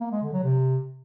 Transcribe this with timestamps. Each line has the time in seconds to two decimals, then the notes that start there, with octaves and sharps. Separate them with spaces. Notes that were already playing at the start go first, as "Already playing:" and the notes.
0.01 A#3
0.12 G#3
0.22 D3
0.33 F#3
0.44 C3